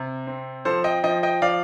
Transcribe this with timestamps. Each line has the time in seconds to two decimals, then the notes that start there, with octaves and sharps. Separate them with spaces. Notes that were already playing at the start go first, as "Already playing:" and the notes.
Already playing: C3
0.27 C4
0.65 F3 A4 C5
0.84 D#5 G5
1.04 F3 D#5 G5
1.23 D#5 G5
1.42 F3 D5 F5